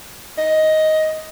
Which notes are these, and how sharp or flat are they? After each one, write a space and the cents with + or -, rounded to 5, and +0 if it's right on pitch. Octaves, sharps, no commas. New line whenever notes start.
D#5 +10